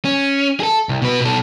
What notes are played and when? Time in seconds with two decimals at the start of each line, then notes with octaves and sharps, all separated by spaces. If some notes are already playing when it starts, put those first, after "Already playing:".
0.05 C#4
0.60 G#4 A4
0.89 C2
1.02 B2 B4
1.21 B2 A4